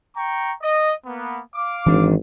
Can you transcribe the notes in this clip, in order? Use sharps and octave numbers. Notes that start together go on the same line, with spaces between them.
G5 A#5 C#6
D#5
A#3 B3
F5 D6
G#1 E3 D4